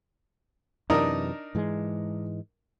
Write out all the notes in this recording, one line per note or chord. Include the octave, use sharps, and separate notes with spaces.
F#2 C3 E3 D4 D#4 A#4
G#2 E3 G#3